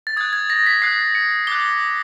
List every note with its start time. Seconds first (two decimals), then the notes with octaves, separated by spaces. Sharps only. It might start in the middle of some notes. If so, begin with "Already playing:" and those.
0.07 A6
0.17 D#6 F#6 G#6
0.33 G#6
0.50 A#6
0.66 B6
0.82 D#6 F#6 C7
1.15 C#7
1.47 D6 F#6 G7